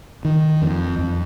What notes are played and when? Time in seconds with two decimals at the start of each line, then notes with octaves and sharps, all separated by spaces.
0.25 D#3
0.62 F2
0.99 F2